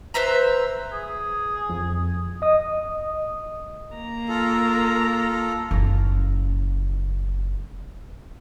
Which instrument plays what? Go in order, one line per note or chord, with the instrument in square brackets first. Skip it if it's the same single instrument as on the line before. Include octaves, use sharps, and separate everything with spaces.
[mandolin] B4 C5 E5 A#5
[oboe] G#4
[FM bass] F2
[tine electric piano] D#5 D#6
[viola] A#3 A#5
[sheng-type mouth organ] F4 A4
[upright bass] F#1 C#3